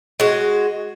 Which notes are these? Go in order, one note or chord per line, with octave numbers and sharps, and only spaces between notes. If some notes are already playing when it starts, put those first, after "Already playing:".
G#3 F#4